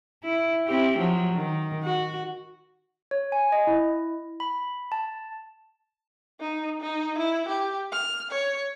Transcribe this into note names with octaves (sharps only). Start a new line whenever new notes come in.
E4
C4 E4 G4
F3 F#3
D#3
F#4
C#5
G#5
D#5
E4
B5
A5
D#4
D#4
E4
G4
F6
C#5